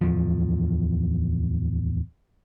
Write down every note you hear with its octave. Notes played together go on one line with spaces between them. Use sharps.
D1 E2 F3